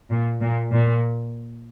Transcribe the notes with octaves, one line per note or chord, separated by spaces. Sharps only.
A#2
A#2
A#2